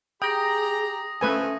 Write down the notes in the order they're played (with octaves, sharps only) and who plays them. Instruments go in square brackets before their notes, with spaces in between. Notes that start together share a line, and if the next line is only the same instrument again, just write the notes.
[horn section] G4 A#5 [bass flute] G#4 [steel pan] G5 [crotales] D#6 A#6
[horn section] F3 A4 [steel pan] A3 B4 G#5 [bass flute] C#4